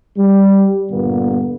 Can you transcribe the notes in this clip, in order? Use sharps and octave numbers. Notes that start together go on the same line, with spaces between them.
G3
G2 A#2 D3 G3 A#3 B3